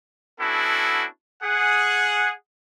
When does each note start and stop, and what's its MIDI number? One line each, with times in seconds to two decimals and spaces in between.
0.40 1.05 59
0.40 1.05 61
0.40 1.05 62
0.40 1.05 64
0.40 1.05 66
0.40 1.05 69
1.43 2.33 68
1.43 2.33 78